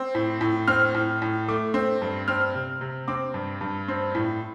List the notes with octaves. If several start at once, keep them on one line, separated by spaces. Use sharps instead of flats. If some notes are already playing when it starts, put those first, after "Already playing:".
Already playing: C4
A2
A2
C4 F6
A2
A2
A3 D6
C4
G2
C4 F6
C3
C3
C4 D6
G2
G2
C4
A2